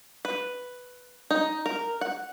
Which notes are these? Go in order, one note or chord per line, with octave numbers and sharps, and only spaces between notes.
B4
D#4
A#4
F#5